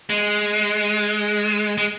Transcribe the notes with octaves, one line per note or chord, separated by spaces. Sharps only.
G#3
G#3